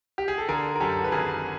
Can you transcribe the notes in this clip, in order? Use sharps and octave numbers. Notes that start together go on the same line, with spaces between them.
G4
G#4
A4
D3 G#4 A#4
A#4
F#2 G4 A4
B4
G#1 G#4 A#4